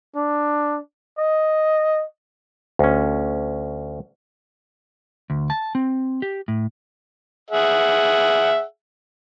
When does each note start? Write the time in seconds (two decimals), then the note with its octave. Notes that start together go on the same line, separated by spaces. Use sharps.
0.16 D4
1.19 D#5
2.79 D2 C#4
5.30 D2
5.50 A5
5.75 C4
6.22 G4
6.48 A2
7.51 G#4 E5 F#5